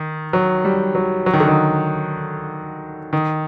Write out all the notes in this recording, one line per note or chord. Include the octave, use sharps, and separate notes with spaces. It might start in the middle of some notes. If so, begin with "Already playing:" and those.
Already playing: D#3
F#3
G3
F#3
F#3
D#3
D3
D#3
D#3